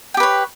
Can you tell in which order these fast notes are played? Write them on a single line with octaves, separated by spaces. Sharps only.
G5 G4 B4 C#5